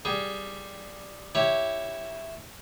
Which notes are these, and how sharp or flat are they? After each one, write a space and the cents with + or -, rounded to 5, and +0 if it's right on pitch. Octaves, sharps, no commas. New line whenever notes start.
G3 +0 G#4 +0
E4 +0 G4 +0 C#5 +0